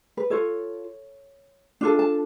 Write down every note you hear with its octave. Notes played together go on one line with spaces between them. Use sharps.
B4
F4 A4 C#5
D4 F4 A4
A5